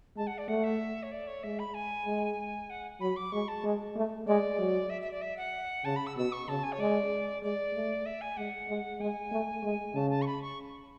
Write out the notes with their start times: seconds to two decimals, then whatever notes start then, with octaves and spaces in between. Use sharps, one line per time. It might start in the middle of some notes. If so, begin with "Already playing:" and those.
0.17 G#3 A5
0.27 F#5
0.38 D5
0.48 A3 F#5
0.63 E5
1.03 C#5
1.11 D5
1.27 C#5
1.43 G#3 E5
1.59 B5
1.74 G#5
2.06 G#3
2.70 F#5
3.00 F#3 B5
3.16 D6
3.32 G#3 C#6
3.48 A5
3.64 G#3
3.95 A3
4.26 G#3 D5
4.59 F#3
4.90 E5
5.01 E5
5.11 D5
5.21 E5
5.37 F#5
5.85 C#3 A5
5.96 B5
6.06 E6
6.16 B2 E6
6.32 C#6
6.48 C#3 A5
6.63 G#5
6.72 C#5
6.79 G#3 D5
7.43 G#3 D5
7.74 A3
8.06 E5
8.21 G#5
8.37 G#3 F#5
8.69 G#3
9.00 G#3 G#5
9.32 A3
9.63 G#3
9.95 C#3 A5
10.10 A5
10.22 C#6
10.26 B5
10.42 C#6